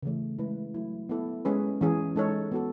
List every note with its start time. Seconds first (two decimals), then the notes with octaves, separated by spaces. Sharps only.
0.03 C#3 E3 A3
0.39 G#3 C#4 E4 B4
0.74 F#3 A3 E4
1.09 B3 E4 A4
1.45 G#3 C#4 G#4 B4
1.81 E3 G#3 C#4 G#4
2.16 G#3 D#4 A4 C#5
2.52 B3 F#4 A4